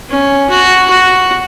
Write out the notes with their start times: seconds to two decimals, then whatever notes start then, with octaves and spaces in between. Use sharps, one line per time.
0.09 C#4
0.50 F#4
0.90 F#4